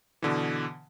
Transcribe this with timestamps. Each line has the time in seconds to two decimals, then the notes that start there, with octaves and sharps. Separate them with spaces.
0.22 B2 D3 E3